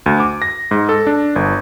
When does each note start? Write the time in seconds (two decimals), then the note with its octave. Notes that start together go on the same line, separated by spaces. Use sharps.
0.06 D2
0.20 D6
0.42 A#6
0.71 G#2
0.89 A4
1.07 D4
1.36 G1